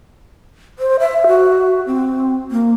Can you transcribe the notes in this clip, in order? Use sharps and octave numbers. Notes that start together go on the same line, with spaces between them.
C5
E5
F#4
C4
A#3